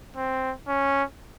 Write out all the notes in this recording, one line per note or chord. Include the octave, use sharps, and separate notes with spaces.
C4
C#4